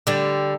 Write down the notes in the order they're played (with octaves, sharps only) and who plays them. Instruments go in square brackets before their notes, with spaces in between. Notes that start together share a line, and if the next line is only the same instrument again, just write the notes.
[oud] D3 G3